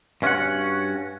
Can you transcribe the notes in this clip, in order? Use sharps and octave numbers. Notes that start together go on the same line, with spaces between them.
G2 C#4 F#4 F#5